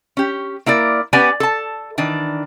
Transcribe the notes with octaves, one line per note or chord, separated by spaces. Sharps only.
C#4 G4
A#3 E4 A#4 D5
B3 C#4 G4 B4 D5 G#5
A4 A5
D#3 E3 D4